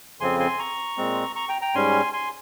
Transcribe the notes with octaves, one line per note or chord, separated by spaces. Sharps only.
F2 C#3 F3 C4 G#5 C6
G#5 C6
A#5 C#6
A#2 G#3 C4
A#5 C#6
G5 A#5
G5 A#5
G#2 G3 C#4 G#5 C6
G#5 C6